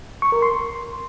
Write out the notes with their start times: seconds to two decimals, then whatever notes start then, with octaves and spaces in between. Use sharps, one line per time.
0.22 C#6
0.32 A#4
0.42 C6